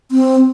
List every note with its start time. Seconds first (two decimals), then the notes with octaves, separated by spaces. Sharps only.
0.11 C4